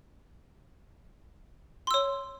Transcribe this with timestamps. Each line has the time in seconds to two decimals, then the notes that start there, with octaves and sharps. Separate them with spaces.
1.87 C6
1.91 E6
1.94 C#5